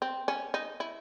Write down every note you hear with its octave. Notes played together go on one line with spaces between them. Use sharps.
C4
C#4
D#4
E4